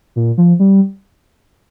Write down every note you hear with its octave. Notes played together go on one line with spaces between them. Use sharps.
A#2
F3
G3